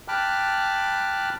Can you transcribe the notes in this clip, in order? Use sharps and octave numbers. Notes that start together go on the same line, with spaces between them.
G5 A5 B5 D6 F6 F#6